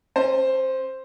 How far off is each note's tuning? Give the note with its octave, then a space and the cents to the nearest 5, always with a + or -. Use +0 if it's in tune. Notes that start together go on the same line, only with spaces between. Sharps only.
C#4 -35 C5 +0